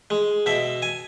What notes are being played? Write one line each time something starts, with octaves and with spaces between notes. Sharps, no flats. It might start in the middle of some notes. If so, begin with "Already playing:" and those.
G#3
B2 E5
G#5